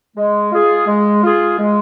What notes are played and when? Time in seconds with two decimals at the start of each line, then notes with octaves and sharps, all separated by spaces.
0.16 G#3
0.52 F4 G#4
0.87 G#3
1.23 F4 G#4
1.58 G#3